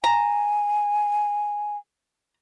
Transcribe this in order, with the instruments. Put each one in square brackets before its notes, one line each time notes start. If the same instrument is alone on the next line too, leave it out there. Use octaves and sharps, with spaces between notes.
[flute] G#5 [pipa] A#5